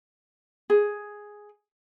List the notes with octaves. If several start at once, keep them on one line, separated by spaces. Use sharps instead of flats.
G#4